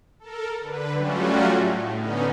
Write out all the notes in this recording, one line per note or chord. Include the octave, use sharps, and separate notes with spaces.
A4 A#4
D3 B4
F#3 G3 A3 C#4 F4 F#4
A2
D3 B3 C#4 D#4